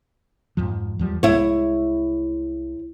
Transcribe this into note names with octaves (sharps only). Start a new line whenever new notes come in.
F2 G#2 F3
E2 F3 G3
C2 G#3 E4 C#5